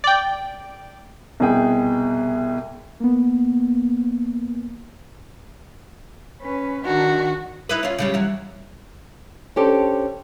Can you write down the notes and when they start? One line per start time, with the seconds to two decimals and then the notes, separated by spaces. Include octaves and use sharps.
0.04 D5 G5
1.40 C2 B2 G#4 G5
3.00 A#3 B3
6.41 C#4 B4
6.85 D#3 D4 F#4
7.69 D#4 E4 B4
7.83 C#4 F4
7.99 C#3 G3 C#4
8.14 E3 F#3
9.56 C#4 D4 G4 A4 C5